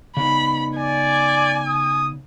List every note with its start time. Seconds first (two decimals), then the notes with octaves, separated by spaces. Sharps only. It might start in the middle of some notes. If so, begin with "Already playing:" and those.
0.17 C#3 B3 D#4 B5
0.76 D5 G#5
1.68 D#6